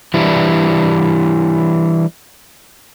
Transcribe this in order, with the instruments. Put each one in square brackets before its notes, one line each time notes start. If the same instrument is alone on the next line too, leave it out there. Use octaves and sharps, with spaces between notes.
[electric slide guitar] E3 G3 D4 E4